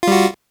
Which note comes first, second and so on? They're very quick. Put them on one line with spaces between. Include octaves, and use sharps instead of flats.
F4 G3 F#4